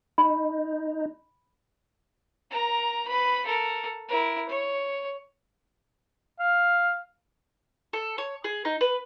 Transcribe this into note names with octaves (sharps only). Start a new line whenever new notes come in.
D#4 B5
A#4 A#5
B4 B5
A4 A#4
E4 A#4
C#5
F5
A4
C#5
G#4
D#4
B4